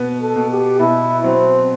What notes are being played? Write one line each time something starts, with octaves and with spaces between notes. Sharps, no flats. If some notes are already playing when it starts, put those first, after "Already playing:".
Already playing: B2 B3
A4
B2
G4
B2 E4
F#3 C4